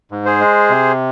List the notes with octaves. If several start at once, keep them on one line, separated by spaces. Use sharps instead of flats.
G#2
G#4 C5
G#3
C3